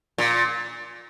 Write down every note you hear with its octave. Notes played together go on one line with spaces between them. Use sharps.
A#2